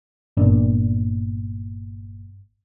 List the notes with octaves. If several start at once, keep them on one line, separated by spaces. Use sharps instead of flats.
G1 A#2 D4